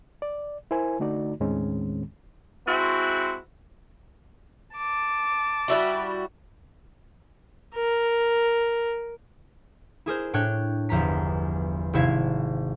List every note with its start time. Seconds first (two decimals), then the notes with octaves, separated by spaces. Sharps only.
0.22 D5
0.71 E4 A#4 C5 G#5
0.99 D3 A3 D#4 F#4 D5
1.40 D#2 A2 D#3 G#3 C4 C#4
2.67 G#3 C4 E4 F#4
4.76 A5 D6
5.68 G3 E4 F#4
7.75 A#4
10.06 E4 G#4 A#4 C5
10.33 A2 D4 C#5 G5 F#6
10.89 G1 E2 F3 A#5 B6
11.93 G#1 C3 E4 F5 G#6